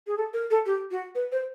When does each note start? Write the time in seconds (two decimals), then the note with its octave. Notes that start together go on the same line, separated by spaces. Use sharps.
0.07 G#4
0.17 A4
0.33 A#4
0.50 A4
0.65 G4
0.90 F#4
1.14 B4
1.31 C5